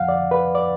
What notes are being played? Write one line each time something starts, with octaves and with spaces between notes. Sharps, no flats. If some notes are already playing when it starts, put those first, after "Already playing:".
Already playing: F2 F3 F5 F#5
D5
B4
D5